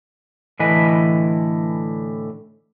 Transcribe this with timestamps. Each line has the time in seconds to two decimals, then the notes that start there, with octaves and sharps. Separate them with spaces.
0.60 A2 D3 E3 B4 D#5 G#5